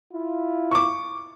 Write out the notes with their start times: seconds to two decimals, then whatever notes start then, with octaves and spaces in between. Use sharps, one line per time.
0.12 E4 F4
0.71 C#6 D6